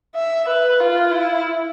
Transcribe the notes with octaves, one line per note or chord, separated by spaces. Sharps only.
E5
B4
F4
E4